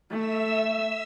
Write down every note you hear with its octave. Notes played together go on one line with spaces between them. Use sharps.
A3 E5 E6